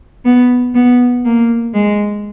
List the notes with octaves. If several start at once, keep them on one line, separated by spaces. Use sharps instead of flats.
B3
B3
A#3
G#3